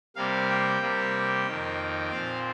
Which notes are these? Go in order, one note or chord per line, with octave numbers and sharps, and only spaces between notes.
C3 G3 A#3 F5
G5
C3 G3 A#3
F2 D#3 A#3
A#2 F3 C4 F5